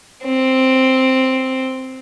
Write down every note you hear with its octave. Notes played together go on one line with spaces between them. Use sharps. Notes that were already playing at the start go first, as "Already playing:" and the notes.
C4